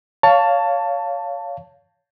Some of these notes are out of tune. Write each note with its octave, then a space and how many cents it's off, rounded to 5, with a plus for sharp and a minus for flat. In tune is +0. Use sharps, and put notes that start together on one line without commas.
C#5 +25 F5 +0 A5 +15